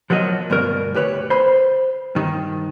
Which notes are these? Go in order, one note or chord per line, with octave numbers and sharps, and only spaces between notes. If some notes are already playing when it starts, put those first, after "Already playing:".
F3 F#3 A#3 F#4 D#5
D2 G2 B2 A#4
D2 G4 B4 C#5
C5 B5
G2 D#3